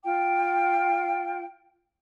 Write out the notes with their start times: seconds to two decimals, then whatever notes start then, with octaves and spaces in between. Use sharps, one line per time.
0.03 F4 G5